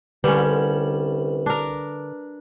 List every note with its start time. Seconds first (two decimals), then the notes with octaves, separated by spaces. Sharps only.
0.24 C2 D3 G3 C#4 B4
1.46 D4 A#4